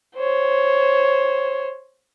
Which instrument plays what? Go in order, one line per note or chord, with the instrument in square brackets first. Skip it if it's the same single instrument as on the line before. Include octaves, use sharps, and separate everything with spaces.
[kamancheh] C5 C#5